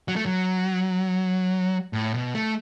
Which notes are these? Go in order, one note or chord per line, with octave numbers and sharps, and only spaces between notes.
F#3
A3
F#3
A2
B2
A3